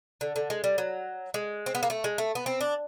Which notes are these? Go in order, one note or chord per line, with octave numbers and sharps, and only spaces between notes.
D3
D3
G#3
G3
F#3
G#3
C4
B3
A#3
A3
G#3
A3
B3
C4
D4